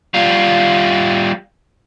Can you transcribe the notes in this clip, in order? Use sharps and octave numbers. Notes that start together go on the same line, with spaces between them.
G3 F4